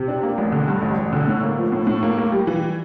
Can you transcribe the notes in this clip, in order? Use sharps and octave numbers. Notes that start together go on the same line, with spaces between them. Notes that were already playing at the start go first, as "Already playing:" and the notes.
Already playing: C3
D4
A#3
A1
D3
G2
A1
A1
D3
A2
A#3
F3
A2
A2
A#3
A#3
G3
E3